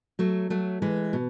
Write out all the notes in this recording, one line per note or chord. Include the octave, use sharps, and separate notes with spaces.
F#3 A3
F#3 A3
E3 G#3
B2